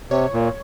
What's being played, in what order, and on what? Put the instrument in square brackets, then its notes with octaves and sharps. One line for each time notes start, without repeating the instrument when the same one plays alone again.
[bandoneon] C3 [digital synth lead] C#5
[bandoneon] A#2